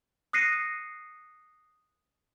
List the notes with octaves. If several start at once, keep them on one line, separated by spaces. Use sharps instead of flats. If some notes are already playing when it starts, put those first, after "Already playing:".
D#6 F#6 A#6 C7 C#7 D#7